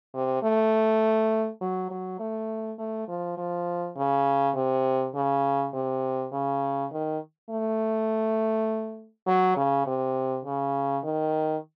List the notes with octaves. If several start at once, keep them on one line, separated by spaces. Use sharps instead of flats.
C3
A3
F#3
F#3
A3
A3
F3
F3
C#3
C3
C#3
C3
C#3
D#3
A3
F#3
C#3
C3
C#3
D#3